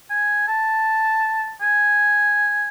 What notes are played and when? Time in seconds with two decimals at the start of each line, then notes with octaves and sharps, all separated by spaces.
0.10 G#5
0.48 A5
1.61 G#5